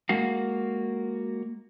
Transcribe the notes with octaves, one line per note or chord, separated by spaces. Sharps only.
G#3 A#3 F#4 F5